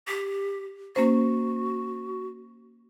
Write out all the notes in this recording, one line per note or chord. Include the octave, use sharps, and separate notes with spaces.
G4
A#3 C#4 F#4 C5